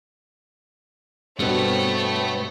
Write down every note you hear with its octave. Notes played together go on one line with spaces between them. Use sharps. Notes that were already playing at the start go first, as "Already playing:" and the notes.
G2 B2 A3 B3 C4 A4 C#5